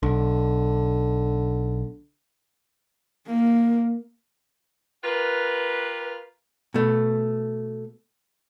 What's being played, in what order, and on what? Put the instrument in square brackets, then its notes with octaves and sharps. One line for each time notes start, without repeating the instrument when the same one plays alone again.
[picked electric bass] B1 [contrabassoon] D3
[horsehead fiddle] A#3
[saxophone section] F4 G4 A#4 B4
[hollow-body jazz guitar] B2 A3